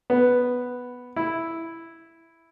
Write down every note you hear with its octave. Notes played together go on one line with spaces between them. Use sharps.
B3
E4